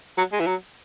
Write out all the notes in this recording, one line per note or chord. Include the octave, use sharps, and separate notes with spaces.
F#3
G#3
E3
F#3